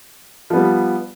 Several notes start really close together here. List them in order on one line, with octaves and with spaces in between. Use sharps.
F3 B3 G3